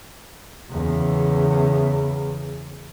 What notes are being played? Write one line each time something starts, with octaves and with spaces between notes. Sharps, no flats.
E2 C#3